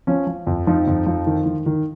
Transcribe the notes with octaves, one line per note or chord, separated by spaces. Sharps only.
F3 C#4
F3
F2
F3 D#4
F2
F3
D#3
D#3
D#3